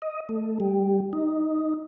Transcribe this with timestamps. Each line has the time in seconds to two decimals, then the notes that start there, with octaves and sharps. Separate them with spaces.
0.02 D#5
0.29 A3
0.60 G3
1.13 D#4